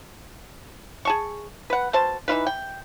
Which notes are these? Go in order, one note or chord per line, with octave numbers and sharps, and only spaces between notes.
G#4 A5 C#6
B4 F#5
B2 C5 A5
E3 D#4 F4 B4
G5